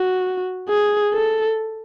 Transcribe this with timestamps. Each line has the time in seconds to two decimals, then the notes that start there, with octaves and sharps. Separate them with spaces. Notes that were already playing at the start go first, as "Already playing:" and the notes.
Already playing: F#4
0.69 G#4
1.13 A4